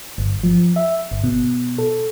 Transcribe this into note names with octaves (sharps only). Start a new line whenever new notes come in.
G1
F3
E5
G1
B2
A4